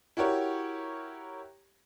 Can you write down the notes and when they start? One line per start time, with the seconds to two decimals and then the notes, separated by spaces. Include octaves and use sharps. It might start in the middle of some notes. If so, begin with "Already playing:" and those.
0.17 E4 F#4 G4 A#4 C#5